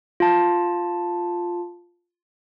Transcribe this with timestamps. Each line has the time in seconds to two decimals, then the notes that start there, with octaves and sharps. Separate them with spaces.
0.20 F4 A5